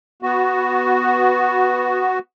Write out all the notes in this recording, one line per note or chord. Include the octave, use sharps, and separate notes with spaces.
B3 F#4